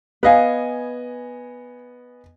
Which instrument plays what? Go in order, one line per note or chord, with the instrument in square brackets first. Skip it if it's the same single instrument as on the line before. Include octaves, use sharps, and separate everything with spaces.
[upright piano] B3 D#5 G#5 [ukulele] B4 F5